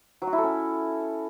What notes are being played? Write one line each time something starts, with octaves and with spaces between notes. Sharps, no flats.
F#3
F#4
E4
A4
C#4